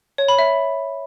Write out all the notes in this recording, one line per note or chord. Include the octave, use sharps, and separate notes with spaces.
C#5
B5
E5